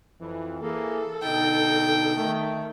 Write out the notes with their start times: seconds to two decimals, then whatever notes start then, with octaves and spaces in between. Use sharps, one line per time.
0.20 F2 E3
0.61 E3 A#3 G#4 A4
1.23 B2 D3 D#4 G5
2.16 D#3 A3